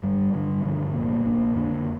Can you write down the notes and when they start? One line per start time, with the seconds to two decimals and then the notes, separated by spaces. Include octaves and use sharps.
0.02 G1 G2 G3
0.33 G2 D3 G3 D4
0.63 G2 D3 F3 D4
0.94 C2 A#2 A#3
1.25 A#1 A#2 A#3 D4
1.55 F2 D3 A#3 D4